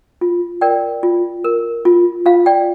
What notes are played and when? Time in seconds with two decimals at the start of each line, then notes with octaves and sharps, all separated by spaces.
0.21 F4
0.61 A#4 D5 G5
1.03 F4
1.44 A#4
1.85 F4
2.26 F4 F5
2.46 D5 G5